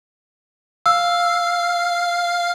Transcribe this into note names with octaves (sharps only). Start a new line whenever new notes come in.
F5 E6